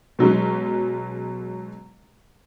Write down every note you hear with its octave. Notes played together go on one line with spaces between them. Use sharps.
B2 F#3 G#3 C#4